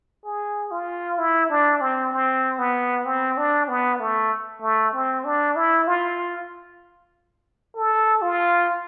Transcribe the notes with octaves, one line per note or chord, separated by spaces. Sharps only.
G#4
F4
E4
D4
C4
C4
B3
C4
D4
B3
A3
A3
C4
D4
E4
F4
A4
F4